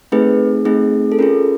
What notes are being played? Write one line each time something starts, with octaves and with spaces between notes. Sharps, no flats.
A3 C4 D#4 G#4 B4
A3 C4 D#4 G#4
A4
C#4 F4 G#4 A#4